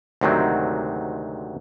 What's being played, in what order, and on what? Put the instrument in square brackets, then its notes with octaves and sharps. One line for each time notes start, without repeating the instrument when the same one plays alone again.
[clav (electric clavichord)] D2 G#2 C3 D#3 F#3 C4